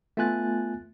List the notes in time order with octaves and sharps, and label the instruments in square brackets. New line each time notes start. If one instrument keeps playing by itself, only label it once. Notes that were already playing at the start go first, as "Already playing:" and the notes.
[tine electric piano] A3 B3 F4 G#5 F#6 A6